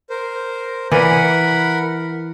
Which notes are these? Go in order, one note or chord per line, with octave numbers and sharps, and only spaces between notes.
A#4 C5
E3 A#4 D5 D#5 F#5 B5